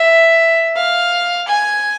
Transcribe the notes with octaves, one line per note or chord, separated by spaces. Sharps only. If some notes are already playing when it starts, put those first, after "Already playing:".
Already playing: E5
F5
G#5